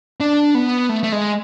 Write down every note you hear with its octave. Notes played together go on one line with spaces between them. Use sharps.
D4
B3
A3
A3
G#3